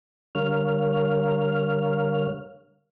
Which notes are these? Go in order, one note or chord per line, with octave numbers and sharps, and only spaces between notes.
D3 G3 A#4 C#5 F5 F6